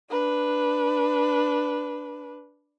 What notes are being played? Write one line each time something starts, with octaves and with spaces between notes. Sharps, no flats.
D4 B4